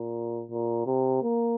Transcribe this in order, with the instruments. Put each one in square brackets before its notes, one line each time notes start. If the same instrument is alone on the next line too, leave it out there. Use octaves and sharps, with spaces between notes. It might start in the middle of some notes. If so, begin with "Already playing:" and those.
Already playing: [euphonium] A#2
A#2
C3
A#3